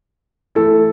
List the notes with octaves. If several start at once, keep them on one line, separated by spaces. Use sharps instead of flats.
E3 A3 E4 A4